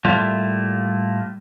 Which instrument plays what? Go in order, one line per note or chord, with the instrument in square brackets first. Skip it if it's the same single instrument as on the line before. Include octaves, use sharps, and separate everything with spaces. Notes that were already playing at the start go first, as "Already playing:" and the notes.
[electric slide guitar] A2 G3 A3 A#3 F4 E5